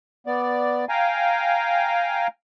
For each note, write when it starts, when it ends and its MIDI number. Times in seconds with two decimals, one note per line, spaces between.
0.27 0.85 59
0.27 0.85 74
0.89 2.27 77
0.89 2.27 79
0.89 2.27 80
0.89 2.27 82